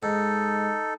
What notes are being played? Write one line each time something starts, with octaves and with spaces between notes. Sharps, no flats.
G#2 D#4 A4